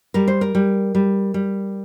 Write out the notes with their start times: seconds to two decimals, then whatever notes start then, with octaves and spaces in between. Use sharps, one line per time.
0.14 G3 A#4
0.28 C5
0.41 A#4
0.55 G3
0.95 G3
1.34 G3